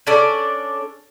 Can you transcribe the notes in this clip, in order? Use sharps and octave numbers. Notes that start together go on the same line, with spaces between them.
C#4 D4 A4 D5